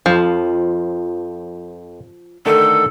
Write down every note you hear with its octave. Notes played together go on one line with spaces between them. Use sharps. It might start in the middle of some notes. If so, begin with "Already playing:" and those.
F2 F3
D3 D#3 A3 A4